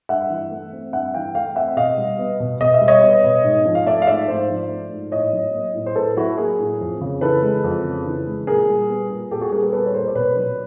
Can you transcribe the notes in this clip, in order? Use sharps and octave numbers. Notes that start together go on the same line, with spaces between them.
G2 E5 F#5
E3
A3
C4
G2 E5 F#5
E3 F5 G5
A3 F5 G5
C4 E5 F#5
B2 D#5 F5
G3
B3
B2
B2 D#5
E5
G3
C#5 D#5
B3
B2
G#2
F3
F5
A3 D5 E5
F5
G#2 D5 E5
G#2 C5 D5
F3
A3
G#2
A2 C#5 D#5
F#3
A#3
A2
C5
A2 A4 B4
F#3 E4 F#4
A#3 G#4 A#4
A2
F2
C#3
E3 A4 B4
G#3
F2
C#3
E3
G#3
A#2 G#4 A#4
G3
B3
A#2
A#2 G4 A4
F#4 G#4
G3 G#4 A#4
A4 B4
B3 A4 B4
C#5
A#2 A#4 C5
D5
B2 B4 C#5
F#3